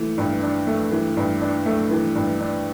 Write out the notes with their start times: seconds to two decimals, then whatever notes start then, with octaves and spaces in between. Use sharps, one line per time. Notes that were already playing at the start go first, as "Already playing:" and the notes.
Already playing: E3 A3
0.18 G2
0.43 D4
0.67 A3
0.92 E3
1.17 G2
1.42 D4
1.66 A3
1.91 E3
2.15 G2
2.40 D4